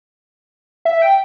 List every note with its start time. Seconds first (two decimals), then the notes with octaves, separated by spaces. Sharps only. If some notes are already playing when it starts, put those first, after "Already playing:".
0.85 E5
1.02 G5